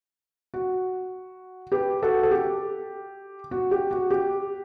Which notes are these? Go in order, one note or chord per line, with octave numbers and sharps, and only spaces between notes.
F#4
G4 B4
F#4 A4
A4
G4
F#4
G4
F#4
G4